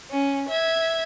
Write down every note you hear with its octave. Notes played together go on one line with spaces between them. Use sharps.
C#4
E5 G#6